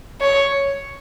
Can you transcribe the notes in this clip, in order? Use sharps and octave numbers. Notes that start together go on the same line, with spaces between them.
C#5